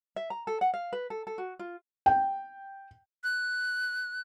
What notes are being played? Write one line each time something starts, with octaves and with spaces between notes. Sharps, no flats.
E5
A#5
A4
F#5
F5
B4
A4
A4
F#4
F4
G5
F#6